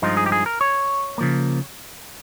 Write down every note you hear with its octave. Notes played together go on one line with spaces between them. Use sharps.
G2 F3 G#3 D#4 F4
G#4
G4
G#4
A#4
C#5
C#3 F3 A#3